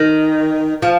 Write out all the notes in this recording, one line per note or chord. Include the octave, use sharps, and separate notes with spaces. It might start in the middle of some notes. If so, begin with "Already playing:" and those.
Already playing: D#3
F3